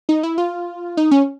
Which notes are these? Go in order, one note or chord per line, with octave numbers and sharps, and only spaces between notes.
D#4
E4
F4
D#4
C#4